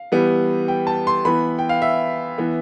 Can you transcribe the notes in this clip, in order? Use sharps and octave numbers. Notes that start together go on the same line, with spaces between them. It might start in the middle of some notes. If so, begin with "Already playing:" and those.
Already playing: F5
E3 G3 B3
G5
A5
C6
E3 B3 B5
G5
F5
E5
E3 B3